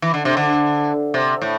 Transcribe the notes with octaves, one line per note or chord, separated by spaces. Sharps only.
E3
D3
C3
D3
C3
A2